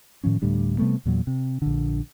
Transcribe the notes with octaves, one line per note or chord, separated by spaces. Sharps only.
A2 D#3 F3 C#4
D2 A2 G3 D4
C3 G3 A3 B3
E2 A#2 F#3
C3
A#1 D3